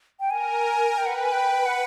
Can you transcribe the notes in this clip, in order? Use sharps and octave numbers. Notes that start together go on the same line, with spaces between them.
G5
A#4 G#5
B4 G5
F#5
G5
G#5
G5
F#5